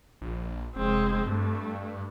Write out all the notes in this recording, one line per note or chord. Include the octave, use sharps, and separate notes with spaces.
A#1
F1 G#3 C4
G2 A3